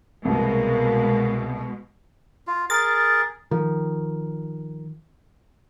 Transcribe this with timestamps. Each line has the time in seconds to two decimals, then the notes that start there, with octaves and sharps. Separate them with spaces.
0.25 C2 B2 G#3 A#3
2.47 F4
2.70 G#4 A#4 A6
3.51 D#3 F3